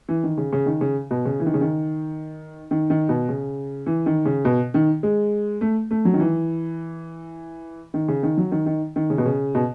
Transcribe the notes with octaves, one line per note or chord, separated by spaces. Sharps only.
E3
D#3
C#3
C#3
D#3
C#3
B2
C#3
E3
D#3
C#3
D#3
D#3
D#3
B2
C#3
E3
D#3
C#3
B2
D#3
G#3
A3
A3
F#3
D#3
E3
D#3
C#3
D#3
F#3
D#3
D#3
D#3
C#3
B2
C#3
B2